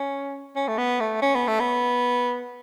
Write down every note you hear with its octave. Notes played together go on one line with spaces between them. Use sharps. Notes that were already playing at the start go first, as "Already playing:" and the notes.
Already playing: C#4
C#4
A3
B3
A3
C#4
B3
A3
B3